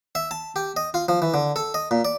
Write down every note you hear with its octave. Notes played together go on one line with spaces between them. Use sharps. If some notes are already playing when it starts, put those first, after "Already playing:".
E5
A5
G4
D#5
F4
F3
E3
D3
A4
D#5
A#2
D5